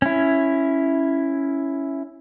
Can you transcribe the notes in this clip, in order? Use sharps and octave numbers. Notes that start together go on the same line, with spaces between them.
C#4 E4